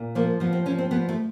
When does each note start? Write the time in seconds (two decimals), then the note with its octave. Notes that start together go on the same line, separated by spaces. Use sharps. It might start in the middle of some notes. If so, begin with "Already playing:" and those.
Already playing: A#2
0.15 F3 A#3
0.40 F3 B3
0.53 C4
0.66 F3 C#4
0.78 C4
0.91 F3 B3
1.09 A3